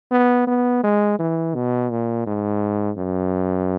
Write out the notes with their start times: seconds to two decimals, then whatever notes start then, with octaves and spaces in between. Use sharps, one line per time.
0.11 B3
0.47 B3
0.83 G#3
1.19 E3
1.55 B2
1.90 A#2
2.26 G#2
2.97 F#2